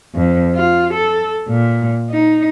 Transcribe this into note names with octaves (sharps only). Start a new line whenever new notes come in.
F2
F4
A4
A#2
D#4